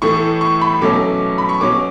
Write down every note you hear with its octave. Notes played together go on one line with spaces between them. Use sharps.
A2 E3 A3 C#6
C#6
B5
B2 F#3 A3 C#4 D6
B5
C#6
B2 F#3 C#4 D6